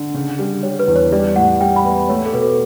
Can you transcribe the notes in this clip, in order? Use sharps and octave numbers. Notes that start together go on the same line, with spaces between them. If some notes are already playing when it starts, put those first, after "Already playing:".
Already playing: D3
C#3
G3
G3 C#5
B4
E2
C#5
G3 D5
A2 F#5
G3 G5
B5
B3
A3 C#5
A4
B2 B4
A4